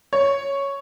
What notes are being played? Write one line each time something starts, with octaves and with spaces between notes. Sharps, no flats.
C#5